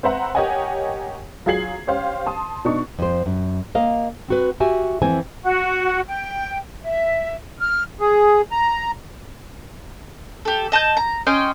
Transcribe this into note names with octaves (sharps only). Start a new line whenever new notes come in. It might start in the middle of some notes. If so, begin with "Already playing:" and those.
C4 B4 C5 E5 F#5 A#5
G4 A#4 C#5 D#5 F#5 G#5
F#3 F4 G#4 G#6 C7 F#7
C#4 G4 C5 F5
A5 C6 D#6
B2 D4 D#4 C#6
F2 C5
F#2
A#3 D#5 F5
C4 F#4 B4
F#4 G4 E5 G#5
F2 E3 C4 G#5
F#4
G5
E5
F6
G#4
A#5
G4 A4
D#5 A5 D#6 G6
A#5
C#4 D#5 G5 C6